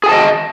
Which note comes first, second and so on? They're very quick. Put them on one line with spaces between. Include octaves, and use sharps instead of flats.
G#4 G#5 A5 D#5